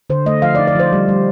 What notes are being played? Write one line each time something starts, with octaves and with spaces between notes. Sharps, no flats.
D3 C5
A3 D#5
F3 F5
D5
D#4
D5
F3 C5
G3
G3